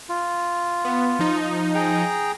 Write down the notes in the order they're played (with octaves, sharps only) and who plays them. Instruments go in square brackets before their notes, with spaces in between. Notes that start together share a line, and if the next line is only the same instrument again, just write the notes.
[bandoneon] F4
[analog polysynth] B3
F3 D#4
[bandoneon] G#4 G5 A#5